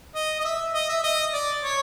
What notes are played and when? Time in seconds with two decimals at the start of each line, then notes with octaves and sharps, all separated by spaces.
0.15 D#5
0.40 D#5
0.45 E5
0.74 D#5
0.89 E5
1.04 D#5
1.33 D5
1.63 C#5